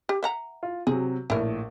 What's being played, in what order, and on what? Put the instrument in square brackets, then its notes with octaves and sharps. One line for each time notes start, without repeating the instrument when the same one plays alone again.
[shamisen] G4
E5 F#5 A#5
[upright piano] F4
[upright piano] C3 F#3 [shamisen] G#4
[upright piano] A#1 A2 [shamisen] E4 A#4